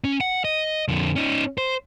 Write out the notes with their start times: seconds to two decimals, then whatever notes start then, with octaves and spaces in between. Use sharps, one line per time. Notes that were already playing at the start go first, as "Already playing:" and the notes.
0.04 C#4
0.21 F#5
0.44 D#5
0.88 F2 D3
1.16 C#4 D#4
1.58 C5